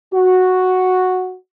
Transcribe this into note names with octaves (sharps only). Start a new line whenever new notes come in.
F#4